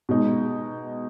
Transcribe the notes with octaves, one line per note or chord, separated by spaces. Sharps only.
B2 G#3 D#4